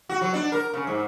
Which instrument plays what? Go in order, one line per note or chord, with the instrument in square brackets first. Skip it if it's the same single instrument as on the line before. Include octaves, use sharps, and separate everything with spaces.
[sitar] F#4
F#3
D4
A#4
C#3
G#2